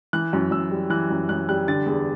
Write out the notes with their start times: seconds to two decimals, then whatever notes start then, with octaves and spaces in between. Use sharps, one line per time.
0.13 E3 F#6
0.33 F#2
0.51 F#2 E6
0.71 G3
0.90 E3 F#6
1.10 F#2
1.29 F#2 F#6
1.49 G3 F#6
1.68 D3 A6
1.86 E2